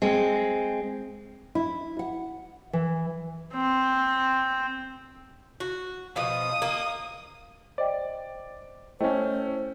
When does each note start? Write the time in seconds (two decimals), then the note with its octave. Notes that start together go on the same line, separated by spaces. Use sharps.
0.02 G#3 C4
1.55 E4
1.99 F#5
2.73 E3
3.54 C4
5.60 F#4
6.16 B2 F3 D#6
6.62 A#3
7.78 C5 D5 D#5 G5
9.00 A3 C#4 E4 C5 D#5 G5